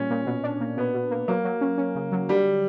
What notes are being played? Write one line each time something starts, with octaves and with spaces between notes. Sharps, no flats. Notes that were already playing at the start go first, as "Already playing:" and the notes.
Already playing: A#2 G3 C#4
A#2
B2
D4
A#3
B2 B3
B2
A#3
F#3 A#3
F#3
C#4
C#4
C#3
F#3
D3 G3